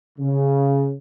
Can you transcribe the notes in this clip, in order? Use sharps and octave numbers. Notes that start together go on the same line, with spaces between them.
C#3